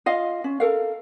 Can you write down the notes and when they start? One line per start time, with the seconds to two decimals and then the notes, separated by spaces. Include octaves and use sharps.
0.06 F4 D#5 F5
0.44 C#4
0.60 A4 A#4 F5